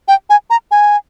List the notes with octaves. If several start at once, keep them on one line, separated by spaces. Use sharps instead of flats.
G5
G#5
A#5
G#5